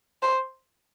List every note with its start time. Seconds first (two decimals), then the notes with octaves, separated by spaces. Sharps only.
0.22 C5